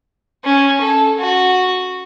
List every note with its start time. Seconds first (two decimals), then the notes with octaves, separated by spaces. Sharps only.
0.44 C#4
0.81 A4
1.18 F#4